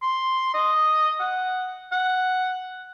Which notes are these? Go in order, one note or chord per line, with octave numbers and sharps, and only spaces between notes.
C6
D#5
F#5
F#5